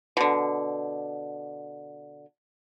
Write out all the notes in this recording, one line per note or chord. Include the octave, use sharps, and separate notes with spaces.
B2 D3